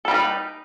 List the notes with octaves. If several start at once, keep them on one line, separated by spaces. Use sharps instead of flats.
G3 D#4 A4 B4